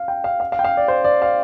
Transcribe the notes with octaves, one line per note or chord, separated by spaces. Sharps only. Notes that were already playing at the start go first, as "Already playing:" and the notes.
Already playing: F5
G5
F5
F5
F5
G5
F5
D5
C5
D5
F5